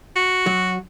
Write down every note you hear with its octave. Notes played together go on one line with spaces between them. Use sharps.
F#4
F#3